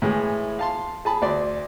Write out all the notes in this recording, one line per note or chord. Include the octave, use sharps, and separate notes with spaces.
A2 E3 G#3
F5 A5 C6
G#4 A5 B5
D2 D5 C6